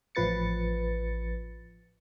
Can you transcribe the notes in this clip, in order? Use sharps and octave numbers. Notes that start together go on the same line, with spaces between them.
A1 F3 B4 A6 C#7